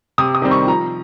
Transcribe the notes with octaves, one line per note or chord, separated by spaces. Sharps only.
C3 D#6
D#6
D#3 G3 C4
C#6
F3 A#5